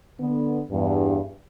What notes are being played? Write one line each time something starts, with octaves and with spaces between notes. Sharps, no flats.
D3 B3
E2 G2